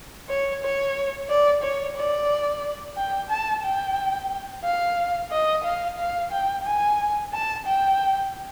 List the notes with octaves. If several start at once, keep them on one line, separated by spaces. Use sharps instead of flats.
C#5
C#5
D5
C#5
D5
G5
A5
G5
F5
D#5
F5
F5
G5
G#5
A5
G5